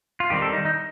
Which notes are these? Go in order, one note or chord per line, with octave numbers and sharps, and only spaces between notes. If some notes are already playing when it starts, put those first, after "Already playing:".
F4
D#3 G3 C4 G4
A4
D#4
D#4